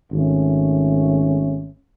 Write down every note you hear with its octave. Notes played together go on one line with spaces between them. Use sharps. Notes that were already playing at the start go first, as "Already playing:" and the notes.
G#1 A3 C#4